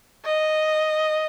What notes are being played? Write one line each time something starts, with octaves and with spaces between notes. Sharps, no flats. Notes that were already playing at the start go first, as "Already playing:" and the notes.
D#5